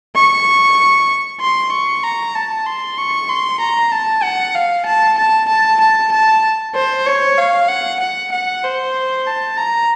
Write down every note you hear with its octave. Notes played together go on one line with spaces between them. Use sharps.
C#6
C6
C#6
A#5
A5
C6
C#6
C6
A#5
A5
F#5
F5
A5
A5
A5
A5
A5
C5
C#5
F5
F#5
F#5
F#5
C5
A5
A#5